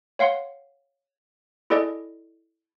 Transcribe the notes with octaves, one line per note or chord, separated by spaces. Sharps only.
C#5 F5 F#5 C6
E4 G#4 A4 D5 D#5